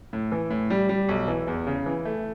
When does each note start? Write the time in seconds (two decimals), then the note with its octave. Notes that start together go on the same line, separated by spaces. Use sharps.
0.13 A2
0.32 E3
0.50 A2
0.70 G3
0.89 G3
1.09 B1
1.28 E3
1.47 E2
1.67 C#3
1.86 E3
2.05 A3